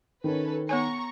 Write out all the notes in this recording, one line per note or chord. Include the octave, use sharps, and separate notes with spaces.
D#3 C#4 A4 B4
B3 C#5 G#5 A#5 C#6